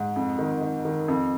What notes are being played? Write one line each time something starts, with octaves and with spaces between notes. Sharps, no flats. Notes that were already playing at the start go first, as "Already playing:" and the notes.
Already playing: G#2
F2
D#3
D#3
D#3
F2